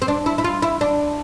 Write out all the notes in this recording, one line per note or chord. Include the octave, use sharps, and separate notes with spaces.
C4
D4
E4
E4
F4
E4
D4